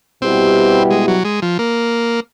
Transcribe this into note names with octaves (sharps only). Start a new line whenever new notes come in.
B2 G3 B3 C4 E4 G4
G#3
F#3
G#3
F3
A#3